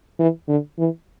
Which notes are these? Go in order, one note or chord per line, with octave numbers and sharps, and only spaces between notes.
E3
D3
E3